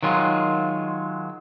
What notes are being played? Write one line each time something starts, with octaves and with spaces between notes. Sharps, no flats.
D#3 F#3 G#3 F4